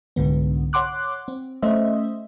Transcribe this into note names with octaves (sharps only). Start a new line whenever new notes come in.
C2 G#2 D3 B3
C#5 F#5 C6 D6 F#6
C4
A3 C#4 C5 D#5 E5